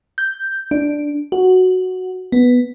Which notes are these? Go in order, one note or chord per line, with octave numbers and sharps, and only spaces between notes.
G6
D4
F#4
B3